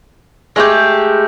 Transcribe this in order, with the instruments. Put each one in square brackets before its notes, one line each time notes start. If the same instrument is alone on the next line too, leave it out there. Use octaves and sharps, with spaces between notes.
[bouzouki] G#3 A3 F4 G4